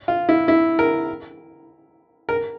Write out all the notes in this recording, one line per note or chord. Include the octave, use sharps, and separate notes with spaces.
F4
E4
E4
A#4
A#4